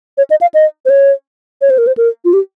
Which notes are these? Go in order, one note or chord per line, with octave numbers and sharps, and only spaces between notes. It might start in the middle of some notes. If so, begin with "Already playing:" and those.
C#5
D#5
F5
D#5
C5
C#5
C#5
C5
A#4
C5
A#4
F4
G4